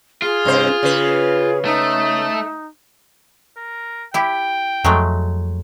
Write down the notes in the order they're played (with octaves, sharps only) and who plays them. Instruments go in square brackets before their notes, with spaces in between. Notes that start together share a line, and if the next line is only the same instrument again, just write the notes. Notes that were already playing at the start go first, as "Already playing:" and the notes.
[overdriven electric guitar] F4 [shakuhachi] G#4
[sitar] G2 C3 C5
C#3 B4
[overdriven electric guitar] A3 [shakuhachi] D#4
[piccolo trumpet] A#4
[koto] E4 G4 [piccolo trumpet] G5
[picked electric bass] F2 [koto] F#3 G#3 A3